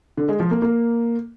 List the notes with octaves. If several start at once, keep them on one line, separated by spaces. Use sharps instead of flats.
D3
G#3
F3
A#3
A#3